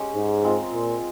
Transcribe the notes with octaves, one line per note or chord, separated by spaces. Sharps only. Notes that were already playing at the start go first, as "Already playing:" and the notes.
Already playing: G#3 C#4 G4
G#2
G#3 C4 F4 A#4
A#2